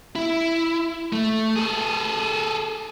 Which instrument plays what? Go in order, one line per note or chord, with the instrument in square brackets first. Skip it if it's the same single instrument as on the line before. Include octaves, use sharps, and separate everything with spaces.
[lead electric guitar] E4
A3
G#4 A4